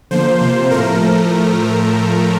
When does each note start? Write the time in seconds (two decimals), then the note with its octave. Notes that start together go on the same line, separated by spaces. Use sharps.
0.11 D3 F3 A#3 C5
0.41 C3 F3 A#3
0.71 A2 F3 A3 A#4